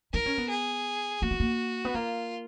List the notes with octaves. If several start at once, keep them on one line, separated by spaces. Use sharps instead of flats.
D#4 A#4
C#4
B3
G#4
A#3 F#4
B3
A#3
B3
A#3 F4